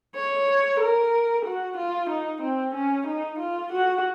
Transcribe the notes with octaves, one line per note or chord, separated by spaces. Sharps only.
C#5
A#4
F#4
F4
D#4
C4
C#4
D#4
F4
F#4